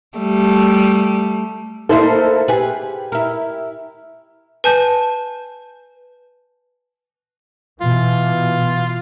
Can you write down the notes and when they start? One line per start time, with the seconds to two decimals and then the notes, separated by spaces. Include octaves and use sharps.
0.18 G3 A3
1.89 A#3 D#4 E4 A4 C5
2.48 G4 G#4 B4
3.12 E4 A#4
4.64 B4 G#5 A5 G6
7.81 B2 E3 F4